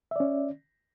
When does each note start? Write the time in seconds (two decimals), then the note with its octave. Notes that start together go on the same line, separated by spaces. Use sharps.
0.11 E5
0.16 D5
0.20 C#4